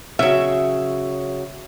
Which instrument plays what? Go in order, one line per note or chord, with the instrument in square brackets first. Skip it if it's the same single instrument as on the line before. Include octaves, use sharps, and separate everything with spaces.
[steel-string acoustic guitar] C#3 F#3 [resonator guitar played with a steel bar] E5